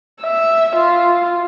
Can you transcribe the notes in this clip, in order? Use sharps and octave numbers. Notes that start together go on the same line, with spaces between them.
E5
F4